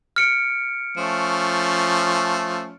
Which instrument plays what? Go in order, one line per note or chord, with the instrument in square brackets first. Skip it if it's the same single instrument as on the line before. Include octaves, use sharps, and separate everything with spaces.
[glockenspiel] F6 C#7 D7
[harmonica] F3 A3 C#4